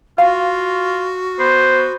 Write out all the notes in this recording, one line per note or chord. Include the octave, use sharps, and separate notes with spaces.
F4 F#4 F5
B3 C5